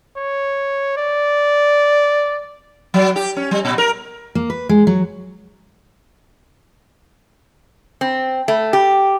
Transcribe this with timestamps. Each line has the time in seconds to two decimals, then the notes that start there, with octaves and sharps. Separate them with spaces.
0.17 C#5
0.97 D5
2.94 F#3
3.16 G4
3.37 C#4
3.51 G3
3.65 A#2
3.78 A#4
4.35 A#3
4.50 B4
4.69 G#3
4.87 F#3
8.01 C4
8.48 A3
8.73 G4